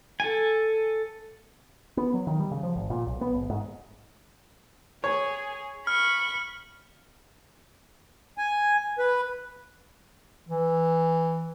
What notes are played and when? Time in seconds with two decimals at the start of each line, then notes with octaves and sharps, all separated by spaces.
0.20 A4 G#5
1.97 B3
2.14 F#3
2.27 D#3
2.40 G3
2.51 C#3
2.63 F3
2.76 G#1
2.90 A#2
3.07 B1
3.21 B3
3.35 G#1
3.50 G#2
5.04 G#4 C#5
5.87 B5 C#6 F6
8.38 G#5
8.99 B4
10.49 E3